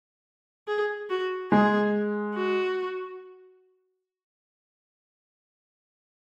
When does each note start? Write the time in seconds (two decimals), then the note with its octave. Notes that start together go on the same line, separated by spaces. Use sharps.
0.68 G#4
1.10 F#4
1.52 G#3 G#4
2.35 F#4